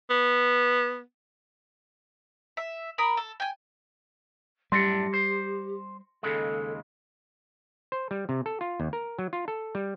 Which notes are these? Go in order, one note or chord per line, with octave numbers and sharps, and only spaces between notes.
B3
E5
A#4 B5 D#6
A4
G5 G#5
F#2 A2 G3 D4 G4 C6 A#6 C#7
C5
D#2 C#3 G#3 A4
C5
G3
C3
A4
F4
D#2
A#4
F#3
F4
A4
G3